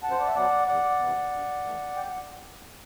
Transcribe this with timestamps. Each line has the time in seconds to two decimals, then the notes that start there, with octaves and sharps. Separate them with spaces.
0.03 F#2 F#5 A5
0.11 C5
0.19 D5
0.27 E5
0.35 F#3 B3 D5 F#5
0.68 E2 D5 F#5
0.99 C3 E3 B3
1.32 G2
1.64 E3 A3
1.96 E2 G5
2.08 F#5